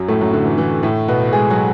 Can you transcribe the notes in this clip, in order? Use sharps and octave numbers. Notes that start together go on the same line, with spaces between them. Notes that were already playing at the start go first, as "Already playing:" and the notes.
Already playing: F#2 F#3
A2 A3
F#2 F#3
D3
E3
E3
A2 A3
B2 B3
G#3 G#4
F#3 F#4